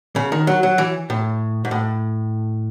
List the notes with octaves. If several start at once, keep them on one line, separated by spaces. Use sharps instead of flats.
C#3
D#3
F#3
F#3
E3
A2
G#2
A2